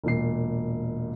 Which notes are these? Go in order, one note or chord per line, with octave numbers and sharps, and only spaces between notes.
E1 A#2 C7